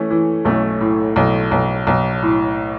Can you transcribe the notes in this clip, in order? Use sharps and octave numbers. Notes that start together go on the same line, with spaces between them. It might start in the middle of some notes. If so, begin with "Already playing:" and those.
Already playing: E3 A3 C#4
E3
B1 A3 C#4
A2
B1
B1
B1
A2